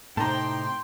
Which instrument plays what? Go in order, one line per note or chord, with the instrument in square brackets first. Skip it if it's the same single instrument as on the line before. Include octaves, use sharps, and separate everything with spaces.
[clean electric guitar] A2 C3 [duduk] D#4 [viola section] G5 C6 [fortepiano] A5 A#5